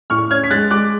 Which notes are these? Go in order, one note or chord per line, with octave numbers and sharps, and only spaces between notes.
A2 C#6 F6
C#4 F6 G#6
B6
G#3 F#6 A6
G#3 D6 F#6